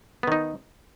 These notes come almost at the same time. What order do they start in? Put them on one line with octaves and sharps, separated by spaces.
B3 D#3 D#4